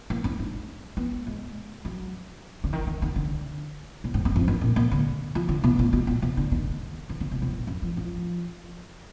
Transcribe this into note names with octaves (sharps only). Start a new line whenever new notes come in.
A#3
D4
D#4
B3
G#3
F#3
D3
D#3
D#3
D#3
D3
A#2
G#2
F#2
F2
F#2
A#2
A#2
D3
F3
D3
B2
A#2
B2
A#2
B2
D3
D#3
D#3
D3
B2
B2
A#2
F#2
F3
F3